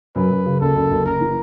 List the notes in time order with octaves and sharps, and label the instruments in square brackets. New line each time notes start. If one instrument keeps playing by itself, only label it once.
[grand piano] F#2 [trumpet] B4
[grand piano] F#2
C#3
[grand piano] F#1 [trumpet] A4
[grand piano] F#1
F#1
[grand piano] F#1 [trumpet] A#4
[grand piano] E3